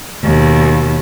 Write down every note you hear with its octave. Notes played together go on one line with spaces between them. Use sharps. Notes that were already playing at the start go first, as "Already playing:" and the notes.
D#2 B2